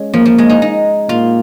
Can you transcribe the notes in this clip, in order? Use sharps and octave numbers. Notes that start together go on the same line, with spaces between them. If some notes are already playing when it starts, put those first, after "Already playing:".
Already playing: G#3 C#4
F3 A#3
F3
G#3
D#4
D#4
A#2 F4